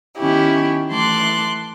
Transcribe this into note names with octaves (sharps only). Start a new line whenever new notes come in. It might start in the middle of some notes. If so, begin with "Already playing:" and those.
D#3 B3 C#4 E4 G4
E3 A3 A5 C6 D6 F#6